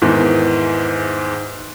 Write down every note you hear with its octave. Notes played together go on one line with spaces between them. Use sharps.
E2 G#2 D#3 E3